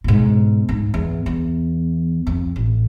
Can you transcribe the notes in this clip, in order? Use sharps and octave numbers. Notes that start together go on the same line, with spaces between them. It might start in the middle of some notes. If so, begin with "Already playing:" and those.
G#2 B2
G#2
E2
E2
F2
A1